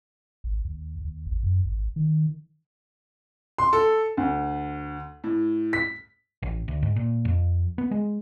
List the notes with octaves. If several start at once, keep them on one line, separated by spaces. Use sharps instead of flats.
G#1
D#2
D#2
G#1
F#2
G#1
D#3
C6
A4
D2
A2
B6
A1
D2
G#2
A#2
F2
B3
G#3